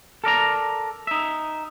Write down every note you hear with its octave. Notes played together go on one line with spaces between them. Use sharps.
A4 A#4 D5 A#5
D#4 E5